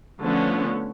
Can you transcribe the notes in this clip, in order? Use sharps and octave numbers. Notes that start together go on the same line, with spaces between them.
D3 F3 A3 B3 C#4